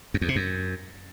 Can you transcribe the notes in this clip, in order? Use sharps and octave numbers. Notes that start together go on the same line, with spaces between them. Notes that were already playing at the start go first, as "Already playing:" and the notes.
F#2
E2
C3
F#2